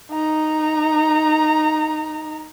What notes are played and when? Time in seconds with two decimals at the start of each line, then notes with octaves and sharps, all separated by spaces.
0.12 D#4 A#5